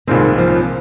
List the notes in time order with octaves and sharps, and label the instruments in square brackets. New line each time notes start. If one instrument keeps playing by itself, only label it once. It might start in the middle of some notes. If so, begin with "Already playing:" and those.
[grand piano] C2 A#2 G#3 C4 [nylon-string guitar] D#3
[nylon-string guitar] F3